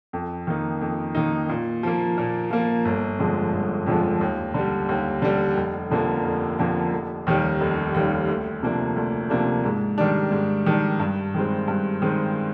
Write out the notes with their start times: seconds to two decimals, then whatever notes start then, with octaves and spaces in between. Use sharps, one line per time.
0.13 F2
0.47 D#3 A#3 D#4
0.81 F2
1.15 D#3 A#3 D#4
1.49 A#2
1.83 F3 A#3
2.18 A#2
2.51 F3 A#3
2.85 G1
3.19 F2 D3 F3 G#3
3.53 G1
3.86 F2 D3 F3 G#3
4.21 D#2
4.54 D3 G3
4.89 D#2
5.22 D3 G3
5.57 F1
5.91 F2 D3 F3 A#3
6.25 F1
6.59 F2 D3 F3 A#3
6.93 F1
7.27 D#2 D#3 G3
7.60 F1
7.94 D#2 D#3 G3
8.28 D2
8.63 C3 F3 A#3 D4
8.96 D2
9.30 C3 F3 A#3 D4
9.64 G#2
9.98 D#3 G3 D4
10.32 G#2
10.66 D#3 G3 D4
11.00 G2
11.34 D#3 G#3 C4
11.68 G2
12.02 D#3 G#3 C4